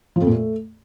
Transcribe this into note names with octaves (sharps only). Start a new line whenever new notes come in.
F3
F2
A#2
A3